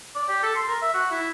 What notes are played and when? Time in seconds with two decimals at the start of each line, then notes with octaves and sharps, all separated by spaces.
0.15 D5
0.29 G4
0.43 A4
0.55 C6
0.68 A#4
0.82 E5
0.94 F#4
1.11 E4